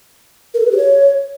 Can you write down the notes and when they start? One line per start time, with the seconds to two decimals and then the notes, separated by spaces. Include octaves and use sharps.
0.54 A#4
0.60 A4
0.66 B4
0.71 G4
0.77 C#5